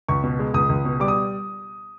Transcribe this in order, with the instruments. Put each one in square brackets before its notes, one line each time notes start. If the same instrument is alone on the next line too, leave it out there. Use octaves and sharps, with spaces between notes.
[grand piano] C#2 C#6
B2
G#3
C#2 D#6
C#2
B2
G3 D6
D#6